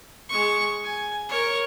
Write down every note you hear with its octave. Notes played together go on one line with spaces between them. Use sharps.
G#3 C#6
G#5
A#4 C#5